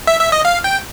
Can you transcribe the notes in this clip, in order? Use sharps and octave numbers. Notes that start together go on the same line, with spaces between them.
E5
E5
D#5
F5
G5